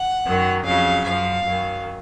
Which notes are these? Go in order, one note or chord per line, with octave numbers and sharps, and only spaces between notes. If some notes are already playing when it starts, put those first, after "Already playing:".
Already playing: F#5
F#2 D#3 F#3
F2 C#3 F#3 F5
F#2 F3 F5
F#2 D#3 F#3